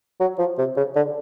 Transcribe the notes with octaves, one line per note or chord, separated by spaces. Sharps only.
F#3
F3
C3
C#3
D3